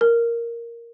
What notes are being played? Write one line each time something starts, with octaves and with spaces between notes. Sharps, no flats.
A#4